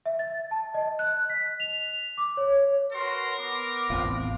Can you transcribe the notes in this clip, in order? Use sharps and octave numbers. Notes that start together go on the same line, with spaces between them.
E5
A6
A5
D#5
F#6
B6
F7
D6
C#5
F#4 A#4 B4 C6
B3 D6
A1 E2 A2 C4 F4